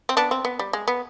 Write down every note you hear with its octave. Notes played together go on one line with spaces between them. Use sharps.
C4
B3 D4
C4
B3
G3
G#3
B3